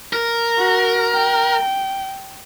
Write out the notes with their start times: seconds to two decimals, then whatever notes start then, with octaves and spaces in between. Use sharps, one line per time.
0.13 A#4
0.58 F#4
1.14 G5